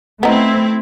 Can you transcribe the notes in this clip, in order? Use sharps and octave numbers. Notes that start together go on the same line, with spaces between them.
A3 B3 C4 D#4 E4